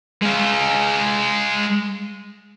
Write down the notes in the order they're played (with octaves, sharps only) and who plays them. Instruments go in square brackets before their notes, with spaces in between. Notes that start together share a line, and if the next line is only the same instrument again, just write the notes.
[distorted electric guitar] G#3 F5